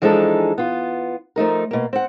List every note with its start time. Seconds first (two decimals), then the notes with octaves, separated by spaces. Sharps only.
0.02 E3 F3 G#3 D4 D#4 A4
0.58 B3 F4
1.36 F3 A3 D#4 A#4
1.71 B2 A#3
1.93 C4 F#5